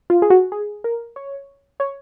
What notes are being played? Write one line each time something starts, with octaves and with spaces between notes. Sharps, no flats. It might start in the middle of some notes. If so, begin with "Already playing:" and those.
F4
G#4
F#4
G#4
A#4
C#5
C#5